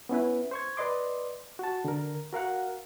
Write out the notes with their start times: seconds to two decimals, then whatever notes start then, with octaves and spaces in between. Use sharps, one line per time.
0.09 B3 C#4 E4 B4
0.51 C5 C#6 G#6
0.77 B4 D5 D#5 C6 D6
1.59 F#4 A5
1.85 D3 A#4
2.33 F#4 A#4 F5 F#5